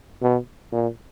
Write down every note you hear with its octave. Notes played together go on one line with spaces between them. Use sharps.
B2
A#2